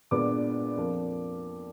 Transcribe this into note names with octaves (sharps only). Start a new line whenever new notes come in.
A#2 G#3 B3 D4 D6
F2 F3 A#3